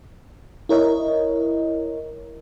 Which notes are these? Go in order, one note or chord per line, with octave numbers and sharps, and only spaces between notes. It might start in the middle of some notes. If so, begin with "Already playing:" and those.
E4 A#4 C#5 D#5